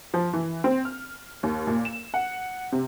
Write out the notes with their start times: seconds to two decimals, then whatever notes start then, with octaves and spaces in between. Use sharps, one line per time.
0.14 F3
0.33 E3
0.64 C4
0.85 F6
1.43 D#2
1.67 A#2
1.85 E7
2.14 F#5
2.72 C3